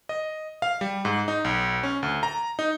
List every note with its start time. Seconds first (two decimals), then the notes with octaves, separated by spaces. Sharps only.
0.09 D#5
0.62 F5
0.81 G3
1.05 G#2
1.28 D#4
1.44 B1
1.83 C#4
2.03 D2
2.23 A#5
2.59 D#4